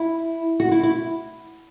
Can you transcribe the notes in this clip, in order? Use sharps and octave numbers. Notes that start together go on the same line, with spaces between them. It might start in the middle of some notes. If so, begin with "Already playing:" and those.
Already playing: E4
F#4
E4
E4